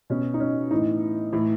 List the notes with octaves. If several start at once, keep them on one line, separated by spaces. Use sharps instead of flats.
B2 C#4
D#4
C#4
A2 E3 D#4
A2 E3